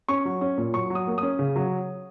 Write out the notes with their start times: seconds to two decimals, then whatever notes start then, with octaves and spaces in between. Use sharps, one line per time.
0.09 C#4 C#6
0.25 F#3
0.41 C#4
0.58 A#2
0.74 F#3 C#6
0.90 F#3
0.95 D#6
1.07 A#3
1.18 C#4 D#6
1.39 C#3
1.56 F#3